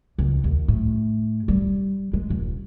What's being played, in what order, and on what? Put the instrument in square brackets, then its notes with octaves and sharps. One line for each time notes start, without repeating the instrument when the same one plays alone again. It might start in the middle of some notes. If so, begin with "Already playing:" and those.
[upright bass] C#2
D#2
A2
G3
G#3
D#1